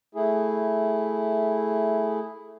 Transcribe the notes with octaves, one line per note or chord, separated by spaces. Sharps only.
A3 E4 G#4